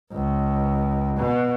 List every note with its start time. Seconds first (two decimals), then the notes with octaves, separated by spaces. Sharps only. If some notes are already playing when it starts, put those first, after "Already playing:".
0.12 C#2
1.17 B2